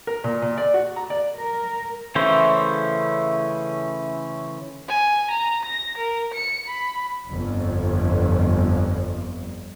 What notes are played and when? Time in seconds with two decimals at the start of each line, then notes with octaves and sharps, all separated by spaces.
0.07 A#4
0.24 A#2
0.42 A#2
0.58 D5
0.74 F#4
0.96 A#5
1.10 D5
1.37 A#4
2.15 C#3 E3 A3 C#4 C5
4.88 G#5
5.31 A#5
5.65 A#6
5.98 A#4
6.34 C#7
6.68 B5
7.31 G1 F2